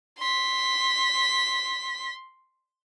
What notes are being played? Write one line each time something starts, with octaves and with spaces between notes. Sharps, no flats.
C6 B6